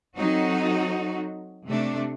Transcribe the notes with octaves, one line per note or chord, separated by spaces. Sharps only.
F#3 C4 D#4 F#4 A4
C3 A3 D4